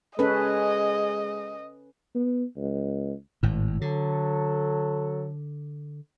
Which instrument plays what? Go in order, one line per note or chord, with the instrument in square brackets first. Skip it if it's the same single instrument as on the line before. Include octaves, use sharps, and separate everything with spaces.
[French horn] G#3 [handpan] C#4 A4 B4 [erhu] D#5
[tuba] B3
C#2
[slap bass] G#1 A2
[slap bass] D3 [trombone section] F#3 A4